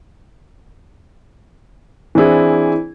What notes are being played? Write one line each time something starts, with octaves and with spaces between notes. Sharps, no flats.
E3 C4 D4 E4 G#4